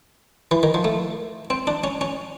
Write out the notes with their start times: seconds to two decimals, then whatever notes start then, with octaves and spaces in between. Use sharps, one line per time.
0.51 E3
0.63 D#3
0.74 F3
0.84 A3
1.50 C4
1.67 D4
1.84 C#4
2.01 C#4